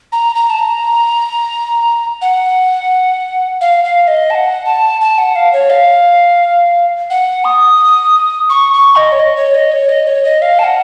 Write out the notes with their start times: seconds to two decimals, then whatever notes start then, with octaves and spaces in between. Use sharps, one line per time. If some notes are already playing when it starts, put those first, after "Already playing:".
0.12 A#5
0.35 A#5
0.50 A5
0.59 A#5
2.22 F#5
3.61 F5
3.84 F5
4.08 D#5
4.30 A5
4.35 F#5
4.66 A5
5.01 A5
5.18 F#5
5.36 F5
5.53 C#5
5.70 F5
7.10 F#5
7.45 D#6
8.50 C#6
8.73 C#6
8.96 D#5
9.12 C#5
9.20 D#5
9.36 C#5
9.54 D#5
9.72 C#5
9.89 D#5
10.07 C#5
10.24 D#5
10.42 F5
10.59 A5
10.64 F#5